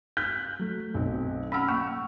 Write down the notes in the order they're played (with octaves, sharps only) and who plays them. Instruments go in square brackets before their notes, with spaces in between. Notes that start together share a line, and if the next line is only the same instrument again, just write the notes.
[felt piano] F#6 G6 B6
[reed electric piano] F#3 A3
[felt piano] B1 C4
[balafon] C#4 F#5 [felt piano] B5 E6 F6
[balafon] A#3 [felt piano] C#6